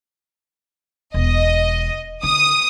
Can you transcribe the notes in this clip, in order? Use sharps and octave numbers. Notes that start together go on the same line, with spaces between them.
E1 D#5
D3 D#6